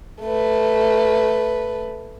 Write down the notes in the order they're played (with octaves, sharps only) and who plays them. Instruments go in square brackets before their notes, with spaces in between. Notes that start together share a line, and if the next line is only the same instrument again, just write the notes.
[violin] A3 B4